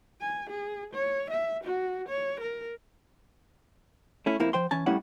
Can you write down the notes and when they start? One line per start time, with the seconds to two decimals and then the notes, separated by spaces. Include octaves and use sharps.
0.21 G#5
0.50 G#4
0.94 C#5
1.30 E5
1.64 F#4
2.08 C#5
2.40 A#4
4.26 A3 C#4 E4
4.40 F2 F3 A#3 E4
4.53 F3 C5 G5 C6
4.71 E3 C#4 G#5 A5
4.86 A2 G3 A#3 C#4 E4 F#5